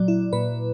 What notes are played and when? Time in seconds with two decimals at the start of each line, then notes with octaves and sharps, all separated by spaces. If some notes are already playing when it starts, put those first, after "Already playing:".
Already playing: A#2 F#3 D5
0.08 E4
0.33 A#2 B4